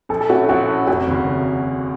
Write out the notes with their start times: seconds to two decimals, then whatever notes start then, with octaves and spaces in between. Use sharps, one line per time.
0.09 A#1 A4
0.21 A4
0.29 A2 A3 C#4 F#4
0.49 A#1 F#4
0.68 A2 A3 C#4
0.87 F1 F#4
1.07 D#2 C#3
1.27 F1